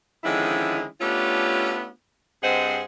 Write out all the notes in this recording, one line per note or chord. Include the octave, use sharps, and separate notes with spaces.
D3 D#3 F3 G#3 C#4 E4
A3 B3 C#4 D4 F4 G4
G2 C4 G#4 C5 D#5 F#5